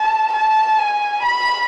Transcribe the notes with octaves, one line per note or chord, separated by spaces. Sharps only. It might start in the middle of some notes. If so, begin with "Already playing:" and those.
Already playing: A5
A5
G#5
B5